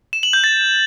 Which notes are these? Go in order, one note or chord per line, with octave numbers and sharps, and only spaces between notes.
E7
F#7
G6
A6